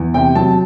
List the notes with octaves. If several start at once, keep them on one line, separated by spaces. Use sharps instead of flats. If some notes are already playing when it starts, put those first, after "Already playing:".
Already playing: E2
C3 G5
F#3 A5